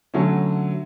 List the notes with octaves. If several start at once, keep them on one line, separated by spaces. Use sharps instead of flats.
D3 F#3 A3 C#4